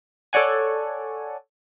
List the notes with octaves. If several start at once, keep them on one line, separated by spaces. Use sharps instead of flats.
A4 C#5 D5 F#5 G#5